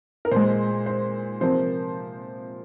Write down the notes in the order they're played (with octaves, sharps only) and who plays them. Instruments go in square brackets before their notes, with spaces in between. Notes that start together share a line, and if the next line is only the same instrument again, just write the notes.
[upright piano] A#4
A#2 G#3 C5
C5
C3 F3 A#3 C5